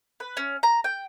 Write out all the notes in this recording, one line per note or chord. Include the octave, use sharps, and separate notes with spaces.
B4
C#4
A#5
G5